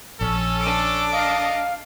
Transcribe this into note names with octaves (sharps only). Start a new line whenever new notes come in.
A#1 C#4 A4
D4 D6
A4 A#4 D#5 F5